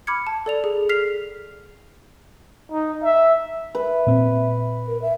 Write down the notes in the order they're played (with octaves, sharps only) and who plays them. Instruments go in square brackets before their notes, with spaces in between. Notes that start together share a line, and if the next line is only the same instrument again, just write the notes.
[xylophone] B5 D6 F6 G#6 C#7
A5
A4 D5 F7
G#4
F6 B6 C7 F7
[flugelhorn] D#4
E5
[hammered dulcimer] B4 [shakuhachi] E5
[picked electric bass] A#2 C4
[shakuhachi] A#4
E5